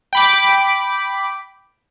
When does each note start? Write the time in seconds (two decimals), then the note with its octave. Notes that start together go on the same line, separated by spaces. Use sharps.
0.13 G5 B5 D6